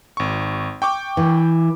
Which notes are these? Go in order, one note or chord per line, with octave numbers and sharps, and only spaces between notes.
G#1 C#6
G5 C#6 D6
E3